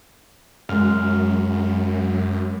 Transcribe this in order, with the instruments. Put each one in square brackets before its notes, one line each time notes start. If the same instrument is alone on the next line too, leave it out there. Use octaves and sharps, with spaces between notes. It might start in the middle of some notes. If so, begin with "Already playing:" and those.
[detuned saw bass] F#2 [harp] G#3 F6